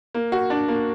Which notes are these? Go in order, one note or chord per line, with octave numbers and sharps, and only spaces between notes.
A#3
F#4
D4
A#3